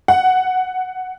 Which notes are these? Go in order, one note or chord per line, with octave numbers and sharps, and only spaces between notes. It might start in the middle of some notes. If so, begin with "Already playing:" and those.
F#5